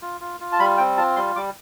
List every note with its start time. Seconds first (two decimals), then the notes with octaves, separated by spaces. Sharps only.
0.02 F4
0.21 F4
0.40 F4
0.52 A5
0.59 G3 B5
0.78 C4 G5
0.97 F4 A5
1.16 G3 C6
1.36 G3 D6